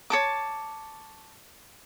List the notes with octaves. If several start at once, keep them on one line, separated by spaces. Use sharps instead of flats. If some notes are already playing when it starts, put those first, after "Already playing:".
C#5 A5 D6